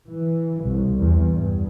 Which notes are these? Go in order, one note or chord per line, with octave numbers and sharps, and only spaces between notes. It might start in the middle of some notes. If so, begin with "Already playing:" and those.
E3
C2
E2
G2